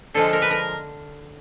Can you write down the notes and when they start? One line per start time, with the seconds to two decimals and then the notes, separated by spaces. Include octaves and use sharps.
0.14 D3 F3 G#3 A4
0.33 A#4
0.42 B4
0.51 A#4